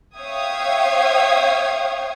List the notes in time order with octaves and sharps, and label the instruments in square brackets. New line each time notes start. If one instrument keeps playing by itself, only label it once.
[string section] C#5 E5 F5 G5 D#6 G#6